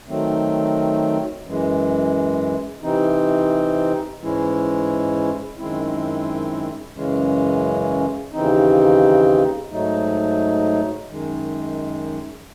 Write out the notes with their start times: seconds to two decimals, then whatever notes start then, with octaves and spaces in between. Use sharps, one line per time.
0.08 D#3 F#3 A3 C4
1.45 F#2 E3 G#3
2.83 C3 E3 C4 D#4
4.21 G#2 E3 G#3 C#4 E4
5.58 F#2 D#3 G#3 C4 E4
6.95 F#2 C#3 E3 G#3 C#4
8.33 D#2 C#3 E3 C4 D#4
9.71 G#2 F#3 A3 D#4
11.08 F#2 D#3 G#3